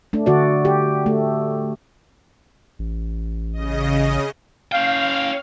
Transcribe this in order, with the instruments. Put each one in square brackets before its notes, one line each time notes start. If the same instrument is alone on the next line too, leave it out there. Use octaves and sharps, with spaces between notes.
[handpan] A3 D4
D3 F#4 D5
G4
A3
[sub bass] A1
[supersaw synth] C#3 D#5
[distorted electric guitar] C#4 G5 [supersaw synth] F5